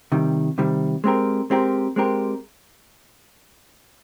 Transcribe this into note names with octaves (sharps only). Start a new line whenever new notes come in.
C3 D#3 G3
C3 D#3 G3
G#3 C4 G4 A#4
G#3 C4 G4 A#4
G#3 C4 G4 A#4